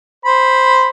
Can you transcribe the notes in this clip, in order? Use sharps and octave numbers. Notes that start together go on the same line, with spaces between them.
C5 B5